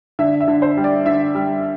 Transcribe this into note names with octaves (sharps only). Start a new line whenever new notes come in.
D3 E5
E5
D3
C5
G3
D5
D3 E5
G3